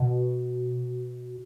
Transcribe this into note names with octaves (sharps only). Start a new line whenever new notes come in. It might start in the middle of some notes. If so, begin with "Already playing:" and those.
Already playing: B2